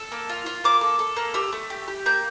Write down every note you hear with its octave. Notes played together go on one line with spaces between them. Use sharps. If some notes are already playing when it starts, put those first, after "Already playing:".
Already playing: A4 E6
A#3
F4
F4
A#3 D6
A4
A4
A#3
G4 E6
A3
G4
G4
A#3 G6